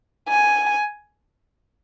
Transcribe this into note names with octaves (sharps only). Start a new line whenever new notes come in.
G#5